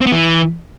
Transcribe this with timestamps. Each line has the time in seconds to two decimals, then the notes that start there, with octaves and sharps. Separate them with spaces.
0.01 C4
0.06 B3
0.12 E3